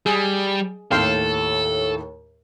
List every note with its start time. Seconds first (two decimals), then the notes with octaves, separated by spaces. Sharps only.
0.06 G3 G#4
0.91 D#2 A2 A4 F5 G5 C6